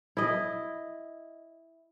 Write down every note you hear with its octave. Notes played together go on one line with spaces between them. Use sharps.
E4 D#5